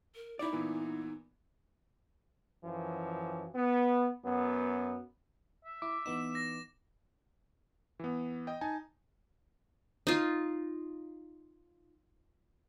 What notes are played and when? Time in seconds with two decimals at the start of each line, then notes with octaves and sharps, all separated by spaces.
0.15 A#4
0.39 D#4 E4 D5
0.53 A#2 E3 B3
2.64 F#2 E3 F3
3.55 B3
4.25 F#2 B3
5.65 E5
5.82 E4 D6
6.06 E3 B3 D#4 E7
6.35 A#6
7.99 E3 B3
8.47 D#5 G5
8.61 D#4 G#5 A5
10.07 D#4 F4